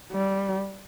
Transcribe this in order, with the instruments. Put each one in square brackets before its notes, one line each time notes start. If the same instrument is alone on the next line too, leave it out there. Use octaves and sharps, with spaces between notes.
[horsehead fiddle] G3